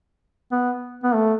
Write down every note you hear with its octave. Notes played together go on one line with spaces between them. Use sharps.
B3
B3
A3